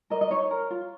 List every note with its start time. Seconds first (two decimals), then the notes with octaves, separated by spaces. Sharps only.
0.10 A#4 D#5
0.21 D#5
0.30 D#4 C#5
0.51 A#4
0.70 F4